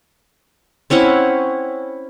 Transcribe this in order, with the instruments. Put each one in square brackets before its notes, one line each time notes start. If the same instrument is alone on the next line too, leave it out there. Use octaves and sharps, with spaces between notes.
[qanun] C4 C#4 E4 F#5